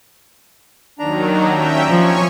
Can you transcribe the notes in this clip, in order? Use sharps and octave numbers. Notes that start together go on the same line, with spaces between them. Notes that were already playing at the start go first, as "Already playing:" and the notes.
D#2 D#3 F#3 D4 A#5
C#4 E5 G5
F3 C#5 G#5 C#6